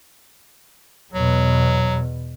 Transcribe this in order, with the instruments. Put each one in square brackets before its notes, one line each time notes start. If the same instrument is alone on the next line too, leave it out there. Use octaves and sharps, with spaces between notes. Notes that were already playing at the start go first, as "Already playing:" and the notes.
[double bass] E2 B2 [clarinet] F#3